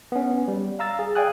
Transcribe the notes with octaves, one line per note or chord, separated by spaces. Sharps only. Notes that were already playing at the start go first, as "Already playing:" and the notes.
B3 C#4
G3
F5 A#5 E6 A6
G#4
D5 F5 G5 G#5 D#6 F#6